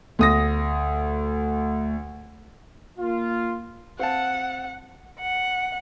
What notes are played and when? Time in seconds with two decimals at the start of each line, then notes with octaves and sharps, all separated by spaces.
0.19 D2 D#6 A#6
2.99 A#3 F4
3.99 C4 F5 F#5 A5
5.21 F#5